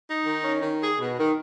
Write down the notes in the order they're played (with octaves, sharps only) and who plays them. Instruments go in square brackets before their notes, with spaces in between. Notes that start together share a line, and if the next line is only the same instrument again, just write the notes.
[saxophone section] D#4
D#3
C#4
D#3
G#4
B2
D#3